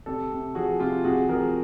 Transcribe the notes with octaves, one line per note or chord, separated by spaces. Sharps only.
C3 G4 A4
C3
F3 F#4 G#4
C3 F4 G4
C3 F#4 G#4
F3 G#4 A#4